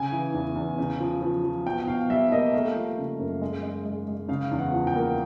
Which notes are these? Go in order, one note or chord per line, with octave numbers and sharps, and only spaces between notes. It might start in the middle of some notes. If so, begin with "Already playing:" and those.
Already playing: C#3 G#5
E3
E2
E2
C#3
F3
F3
F3
B2 G5
B2 F5
G3 E5
A#3 D#5
A3 F5
F3
C#3
F#2
G#3
G#3
G#3
G#3
C#3 F5
E2
F#5
F3
G5
A#3